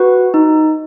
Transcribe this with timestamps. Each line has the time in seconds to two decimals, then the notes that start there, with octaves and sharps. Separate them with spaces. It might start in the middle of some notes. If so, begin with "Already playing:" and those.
Already playing: F#4 B4
0.34 D#4